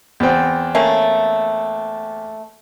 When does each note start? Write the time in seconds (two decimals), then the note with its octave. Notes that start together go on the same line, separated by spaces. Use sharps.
0.20 E2 C4
0.75 A3 A#3 C#4